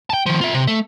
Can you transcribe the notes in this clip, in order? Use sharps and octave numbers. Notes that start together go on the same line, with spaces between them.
G5 A5
D#3 F3
F4 E5
C3
A3